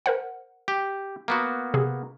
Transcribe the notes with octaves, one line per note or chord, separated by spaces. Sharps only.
A#4 C5 F#5
G4
A#3 B3 F#4
C3 G#4